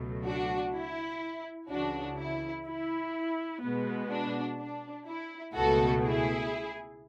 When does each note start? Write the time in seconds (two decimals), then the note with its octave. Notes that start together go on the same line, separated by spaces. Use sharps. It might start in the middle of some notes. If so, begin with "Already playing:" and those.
Already playing: C#2 B2 F#3 A3
0.26 D4 F#4
0.75 E4
1.70 C#2 C#3 E3 D4 F#4
2.18 E4
2.66 E4
3.62 B2 G#3 B3
4.10 D4 F#4
4.58 D4
5.06 E4
5.54 C#2 B2 A3 F#4 A4
6.03 E4 G#4